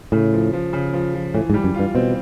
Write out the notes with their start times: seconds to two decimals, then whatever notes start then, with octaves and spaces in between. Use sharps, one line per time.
0.12 A2 C#3
0.33 F3
0.53 F3
0.73 C#3
0.93 F3
1.14 F3
1.34 A2 E3
1.50 G#2
1.54 G3
1.64 F#2
1.75 G2 F4
1.95 B2 C4